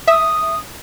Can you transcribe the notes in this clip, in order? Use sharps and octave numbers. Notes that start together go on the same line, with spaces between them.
E5 D#6